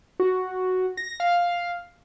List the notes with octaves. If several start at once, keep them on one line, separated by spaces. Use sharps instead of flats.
F#4
A#6
F5